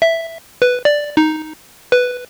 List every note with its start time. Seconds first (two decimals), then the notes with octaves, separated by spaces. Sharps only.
0.02 E5
0.62 B4
0.85 D5
1.17 D#4
1.92 B4